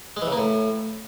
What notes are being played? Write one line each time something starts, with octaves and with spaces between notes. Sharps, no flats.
G#3
E3
C#3
A#3
A2